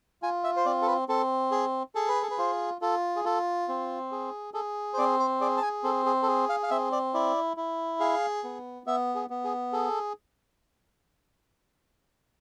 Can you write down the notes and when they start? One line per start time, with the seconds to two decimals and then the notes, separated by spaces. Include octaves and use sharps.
0.22 F4 G#5
0.44 E5
0.56 C5
0.66 C4 D5
0.82 A4
0.87 B4
1.08 C4 A4
1.52 G#4
1.95 G#4 A4
2.08 B4
2.22 A4
2.31 B4
2.38 F4 C5
2.81 F4 A4
3.16 G#4
3.24 F4 A4
3.69 C4
4.12 G#4
4.54 G#4 A4
4.94 C5
4.98 C4 D5
5.20 C5
5.41 G#4 D5
5.57 A5
5.62 G#5
5.84 C4 A4
6.06 G#4
6.23 A4
6.27 G#4
6.49 F5
6.63 F5
6.71 C4 E5
6.92 D5
7.14 E4 D5
7.57 E4
8.00 G#4 F5
8.44 B3
8.86 B3 E5
9.15 G#4
9.30 B3
9.44 G#4
9.73 G#4 A4